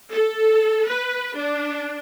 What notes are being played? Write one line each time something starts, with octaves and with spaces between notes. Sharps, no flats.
A4
B4
D4